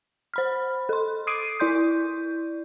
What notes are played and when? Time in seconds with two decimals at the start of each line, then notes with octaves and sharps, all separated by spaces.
0.34 C5 B5 F6
0.89 A4 C6
1.27 D6 D#6 C7 D7 D#7
1.60 E4 D5 C6 G6